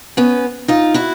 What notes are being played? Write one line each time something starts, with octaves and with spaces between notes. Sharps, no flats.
B3 C#4
D#4 F4
E4 F#4